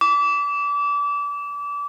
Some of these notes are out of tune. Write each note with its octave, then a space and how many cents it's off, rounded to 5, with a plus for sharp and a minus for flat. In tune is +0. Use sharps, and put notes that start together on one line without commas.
D6 -30